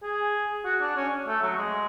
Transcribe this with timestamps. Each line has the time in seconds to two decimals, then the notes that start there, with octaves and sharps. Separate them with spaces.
0.03 G#4
0.65 F#4
0.81 D4
0.96 C#4
1.27 A3
1.42 F#3
1.57 G#3